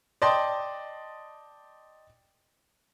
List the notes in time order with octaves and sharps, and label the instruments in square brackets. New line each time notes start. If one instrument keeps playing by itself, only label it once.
[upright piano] D5 D#5 G5 A5 C6